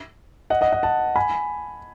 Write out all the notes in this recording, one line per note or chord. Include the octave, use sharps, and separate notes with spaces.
D#5 F#5
D#5 F#5
D#5 F#5
F#5 A5
G#5 B5